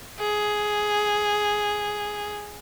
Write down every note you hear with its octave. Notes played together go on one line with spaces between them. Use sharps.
G#4